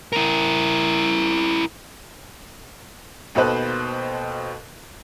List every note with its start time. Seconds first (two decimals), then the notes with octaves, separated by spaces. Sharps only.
0.13 E4 A#4
3.35 D#2 B2 A4 B4 C5 F#6